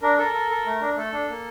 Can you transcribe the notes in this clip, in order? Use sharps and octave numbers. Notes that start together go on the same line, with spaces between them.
D4 A#4
A4 A#4
A4
A4
A3
D4
A3 A4
D4
A#3